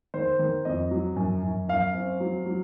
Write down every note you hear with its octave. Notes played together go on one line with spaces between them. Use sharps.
D#3 C5
D#3
F2 D#5
F#3
F#2
F#2
F#2 F5
C4
F#3
F#3